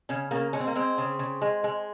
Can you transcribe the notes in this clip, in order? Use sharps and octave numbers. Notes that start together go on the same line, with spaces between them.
C#3 C#4
C#3 A#3
G#3 C#4
C4
A#3
G#3 C4
C#3
C#3
G#3
G#3